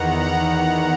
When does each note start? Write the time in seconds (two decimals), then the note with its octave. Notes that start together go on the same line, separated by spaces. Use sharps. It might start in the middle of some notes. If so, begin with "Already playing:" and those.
Already playing: E2 D#3 F#5 A#5
0.22 F#5 A#5